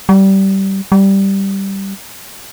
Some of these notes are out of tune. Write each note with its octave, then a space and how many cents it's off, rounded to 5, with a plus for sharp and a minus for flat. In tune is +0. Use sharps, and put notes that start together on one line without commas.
G3 -20
G3 -5